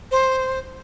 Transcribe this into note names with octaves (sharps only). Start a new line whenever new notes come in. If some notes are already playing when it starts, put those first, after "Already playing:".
C5